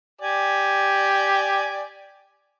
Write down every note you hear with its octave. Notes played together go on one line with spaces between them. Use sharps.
G4 D5 G#5